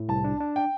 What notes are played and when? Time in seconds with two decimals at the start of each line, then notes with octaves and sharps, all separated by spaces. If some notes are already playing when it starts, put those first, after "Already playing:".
Already playing: A2
0.09 C2 A5
0.24 D4
0.40 D4
0.56 G5